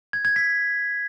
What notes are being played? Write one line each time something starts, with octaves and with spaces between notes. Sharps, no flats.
G#6
G#6
B6